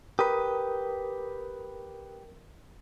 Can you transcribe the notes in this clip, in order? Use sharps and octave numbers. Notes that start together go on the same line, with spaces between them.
G4 A#4 B4 D#6